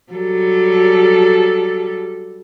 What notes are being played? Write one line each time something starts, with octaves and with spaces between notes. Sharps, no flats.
F#3 G3 A4